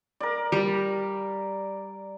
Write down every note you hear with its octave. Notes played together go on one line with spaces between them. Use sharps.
A#4 D5
G3